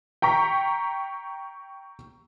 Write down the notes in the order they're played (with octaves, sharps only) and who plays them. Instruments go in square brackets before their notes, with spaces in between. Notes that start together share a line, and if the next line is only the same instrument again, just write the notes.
[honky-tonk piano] G5 A#5 C#6 B6